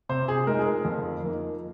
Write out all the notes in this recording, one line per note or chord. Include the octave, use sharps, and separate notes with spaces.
C3 C5
G#4
G#3 D#4 A#4
G#4
A#4
F2
F3 A#3 D#4